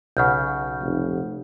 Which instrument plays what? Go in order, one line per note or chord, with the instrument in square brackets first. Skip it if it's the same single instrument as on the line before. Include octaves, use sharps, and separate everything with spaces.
[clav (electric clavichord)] B1 C#3 [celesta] F#5 F6 G6
[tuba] F1